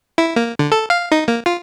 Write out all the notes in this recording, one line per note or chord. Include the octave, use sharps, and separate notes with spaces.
E4
A#3
D3
A4
F5
D#4
A#3
F4